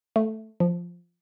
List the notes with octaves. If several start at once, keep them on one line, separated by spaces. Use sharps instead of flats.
A3
F3